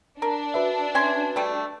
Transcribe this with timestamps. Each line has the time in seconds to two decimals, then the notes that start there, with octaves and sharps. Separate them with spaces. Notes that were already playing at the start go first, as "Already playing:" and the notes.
0.22 D4 A#4
0.54 F#4 B4 E5
0.95 C#4 G#5 C6
1.36 G3 A3